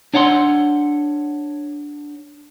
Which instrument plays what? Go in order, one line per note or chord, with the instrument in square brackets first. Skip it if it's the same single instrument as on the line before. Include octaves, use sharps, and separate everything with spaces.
[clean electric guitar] D4 C#5 F#5 A5 C6